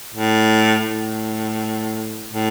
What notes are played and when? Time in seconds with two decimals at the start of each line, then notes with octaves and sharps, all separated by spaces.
0.14 A2
0.87 A2
2.33 A2